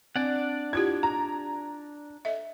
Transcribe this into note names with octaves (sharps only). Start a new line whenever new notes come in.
C4 D4 D5 F#5
E4 F4 G4 G#6
A#5
A4 D#5 E5